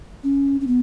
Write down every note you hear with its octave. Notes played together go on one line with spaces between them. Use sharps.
C#4
C#4
B3